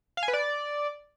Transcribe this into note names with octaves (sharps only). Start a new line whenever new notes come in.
F5
G#5
B4
D5